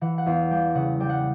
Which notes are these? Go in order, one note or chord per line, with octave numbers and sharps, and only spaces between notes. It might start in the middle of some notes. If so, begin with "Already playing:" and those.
E3 F#5
F#5
E2 F5
G3 G5
C#3 F#5
G3 G5
F#5